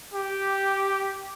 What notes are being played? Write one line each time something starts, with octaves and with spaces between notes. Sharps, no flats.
G4